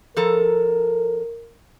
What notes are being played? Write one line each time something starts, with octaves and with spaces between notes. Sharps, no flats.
F3 A4 A#4 A#5